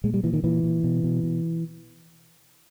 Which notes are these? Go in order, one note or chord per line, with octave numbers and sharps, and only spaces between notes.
A#2 G#3
G3
A#2 E3
D#3
A#2 E3
A#2
B2
B2
B2